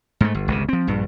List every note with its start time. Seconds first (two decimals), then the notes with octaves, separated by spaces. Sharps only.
0.21 G#2 A3
0.34 G1
0.48 G1 C#2 C3
0.69 F3 C4
0.87 A#1 G2